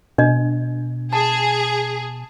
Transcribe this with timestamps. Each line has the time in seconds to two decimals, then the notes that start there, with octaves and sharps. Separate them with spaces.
0.18 B2 D4 D#5
1.13 G#4 A5